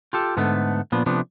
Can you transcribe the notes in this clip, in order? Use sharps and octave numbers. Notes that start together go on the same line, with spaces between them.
F4 G4 A4
G#2 D3 A3 B3
A#2 F3 B3 D4
C3 F3 A3 B3 D4